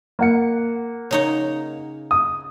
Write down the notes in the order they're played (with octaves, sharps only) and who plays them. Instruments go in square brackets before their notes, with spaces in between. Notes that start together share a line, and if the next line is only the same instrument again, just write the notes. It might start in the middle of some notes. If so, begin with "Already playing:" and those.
[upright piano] A#3 F#5 C#7
[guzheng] C#3 D#4 C#5
[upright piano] D#6